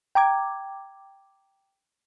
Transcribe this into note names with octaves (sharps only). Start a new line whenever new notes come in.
G5 A#5 D6 G#6